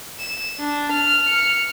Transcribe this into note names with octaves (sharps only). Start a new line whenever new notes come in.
E7
D4
F6
F6 C#7